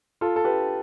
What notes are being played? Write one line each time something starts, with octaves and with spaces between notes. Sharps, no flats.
F4 A4
A4
G4 B4